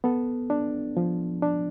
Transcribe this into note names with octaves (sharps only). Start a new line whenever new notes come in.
B3 A4
D4
F3
D4